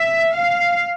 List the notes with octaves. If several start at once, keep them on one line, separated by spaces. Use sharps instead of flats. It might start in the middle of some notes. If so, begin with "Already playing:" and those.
Already playing: E5
F5